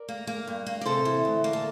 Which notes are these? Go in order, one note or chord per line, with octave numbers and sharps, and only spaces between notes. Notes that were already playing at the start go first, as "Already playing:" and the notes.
Already playing: A#4 D5
A#3
A#3
G2
A#3
D5
C3 A4 C5
E3
D2
A#3
A4